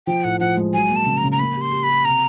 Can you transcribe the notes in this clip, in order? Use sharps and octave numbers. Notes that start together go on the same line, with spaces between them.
F3 G5
A2 F#5
F3 F#5
G#3
F#3 G#5
A#3
A5
C#3
A#5
C#3
A#5
A#3 B5
G4 C6
G4
B5
G4
C3 A#5